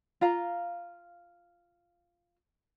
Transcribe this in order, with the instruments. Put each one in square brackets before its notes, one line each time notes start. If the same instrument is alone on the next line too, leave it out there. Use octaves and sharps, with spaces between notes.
[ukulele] F4 F5 A#5